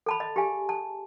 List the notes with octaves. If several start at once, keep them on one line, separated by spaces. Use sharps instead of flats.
A4 A5 B5
D#5
G4 G#4 F5 G#5
A5